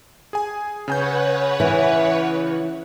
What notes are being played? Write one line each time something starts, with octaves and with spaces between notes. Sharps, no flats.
G#4 G#5
C#3 B4 C#5 F#5 G#5 G6
E3